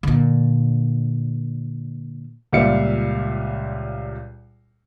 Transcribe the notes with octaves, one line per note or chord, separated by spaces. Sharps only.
A#2 D3
C#2 A#2 G3 E5 F5 C#7